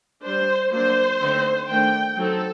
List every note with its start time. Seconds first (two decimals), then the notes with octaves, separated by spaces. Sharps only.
0.24 G3 D4 C5
0.73 F#3 A#3 D4 C5
1.21 D3 A3 C4 D#4
1.69 D#3 A3 D4 G5
2.18 F#3 C4 D#4 A4